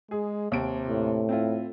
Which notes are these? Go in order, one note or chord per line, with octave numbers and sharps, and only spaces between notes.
G#3 G#4
D#2 C3 D7
A2
C4 E4 F4